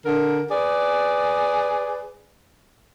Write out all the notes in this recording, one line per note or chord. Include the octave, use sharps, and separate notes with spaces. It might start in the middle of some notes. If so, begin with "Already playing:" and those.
D3 A#4
G#4 B4 D5